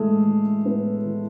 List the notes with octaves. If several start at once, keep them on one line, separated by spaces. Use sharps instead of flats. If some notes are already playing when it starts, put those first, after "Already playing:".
Already playing: A2 E3 G#3 A3 A4
E3
A2 B3 B4
E3